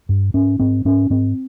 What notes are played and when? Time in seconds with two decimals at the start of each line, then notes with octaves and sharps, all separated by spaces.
0.09 G2
0.34 G#2 C#4
0.60 G#2 C4
0.85 G#2 C#4
1.10 G#2 C4